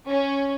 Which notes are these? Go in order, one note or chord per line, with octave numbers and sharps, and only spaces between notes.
C#4